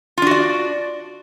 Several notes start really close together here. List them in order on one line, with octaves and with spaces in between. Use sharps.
F4 D4 F#4 D5